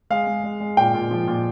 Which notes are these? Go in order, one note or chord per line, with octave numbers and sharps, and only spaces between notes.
G#3 F5
G#3
G#3
G#3
A#2 G5
A#2
F3
A#2